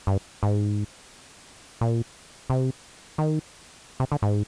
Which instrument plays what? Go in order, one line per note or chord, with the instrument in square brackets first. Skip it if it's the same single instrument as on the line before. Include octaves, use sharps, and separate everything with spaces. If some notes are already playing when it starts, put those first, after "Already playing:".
[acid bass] G2
G#2
A#2
C3
D#3
C3
D3
G#2